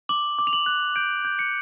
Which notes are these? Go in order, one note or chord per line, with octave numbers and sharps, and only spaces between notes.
D6 F#7
D6
F7
F#7
F#6
G6 D7
G6
C#7